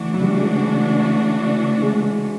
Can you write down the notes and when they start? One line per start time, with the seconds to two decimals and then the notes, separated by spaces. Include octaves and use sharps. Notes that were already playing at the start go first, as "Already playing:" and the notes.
Already playing: C#3 E3 A3 D4 F#4
0.14 F#3
0.21 G3
0.39 G#3
1.82 G#3